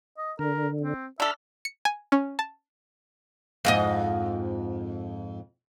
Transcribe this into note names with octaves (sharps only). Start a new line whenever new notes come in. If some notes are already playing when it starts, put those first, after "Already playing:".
D#5
D3 A#4
C4
D4 A4 E5 B5 F6
C#7
G#5
C#4
A5
F2 G#2 D#5